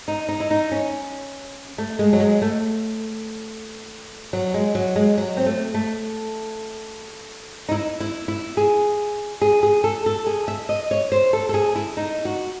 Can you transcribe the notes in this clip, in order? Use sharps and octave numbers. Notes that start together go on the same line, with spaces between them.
D#4
D#4
E4
D#4
C#4
A3
G#3
F#3
G#3
A3
F#3
G#3
F#3
G#3
F#3
C4
A3
A3
D#4
E4
E4
E4
G#4
G#4
G#4
A4
A4
G#4
E5
D#5
C#5
C5
A4
A4
G#4
E4
D#4
F#4